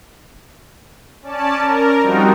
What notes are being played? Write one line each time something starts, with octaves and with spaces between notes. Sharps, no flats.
C#4 D5 A5
A#4
F3 G3 C4 D#4 F#4